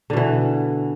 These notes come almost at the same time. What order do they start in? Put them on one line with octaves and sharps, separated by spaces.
D3 B2 E3